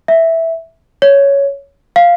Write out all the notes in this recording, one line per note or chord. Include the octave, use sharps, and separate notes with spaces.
E5
C#5
F5